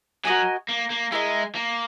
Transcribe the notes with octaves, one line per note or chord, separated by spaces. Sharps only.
F#3 F#4 A#4 D#5 G#5
A#3
A#3
G#3 E4 A#4 D#5
A#3